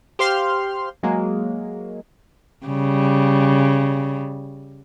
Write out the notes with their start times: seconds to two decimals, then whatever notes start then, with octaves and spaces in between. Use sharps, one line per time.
0.19 G4 C5 F5 C6 F6
1.03 F#3 G#3 A#3
2.67 C#3 G3